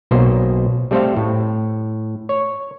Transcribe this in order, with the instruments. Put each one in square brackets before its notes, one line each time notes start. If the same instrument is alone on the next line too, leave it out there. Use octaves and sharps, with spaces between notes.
[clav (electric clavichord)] B1 B2 A#3 C5
G3 A3 C4 A4 C5 F5
A2
C#5